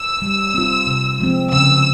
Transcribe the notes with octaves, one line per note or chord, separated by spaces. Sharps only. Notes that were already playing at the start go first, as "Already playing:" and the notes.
Already playing: E6
G3
C4 F4
C3
F3 G#3 C4
C#3 E6